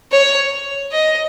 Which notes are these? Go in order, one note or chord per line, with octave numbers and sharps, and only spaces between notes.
C#5
D#5